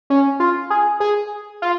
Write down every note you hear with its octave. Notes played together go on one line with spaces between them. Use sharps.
C#4
F4
G#4
G#4
F4